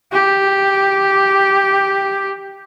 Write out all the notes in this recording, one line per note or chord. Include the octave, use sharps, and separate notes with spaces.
G4